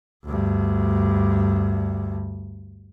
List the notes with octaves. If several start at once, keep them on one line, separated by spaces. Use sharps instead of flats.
D2 G2